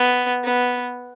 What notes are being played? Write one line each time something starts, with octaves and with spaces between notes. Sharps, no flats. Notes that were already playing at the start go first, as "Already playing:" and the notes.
Already playing: B3
B3